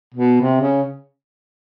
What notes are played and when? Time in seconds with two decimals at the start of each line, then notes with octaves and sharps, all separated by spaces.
0.14 B2
0.41 C3
0.61 C#3